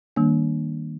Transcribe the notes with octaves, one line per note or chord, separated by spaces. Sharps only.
D#3 G3 A#3 D4